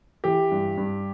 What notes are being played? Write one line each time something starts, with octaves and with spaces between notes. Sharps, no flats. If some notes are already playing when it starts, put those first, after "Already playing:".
E3 G4
G2
G2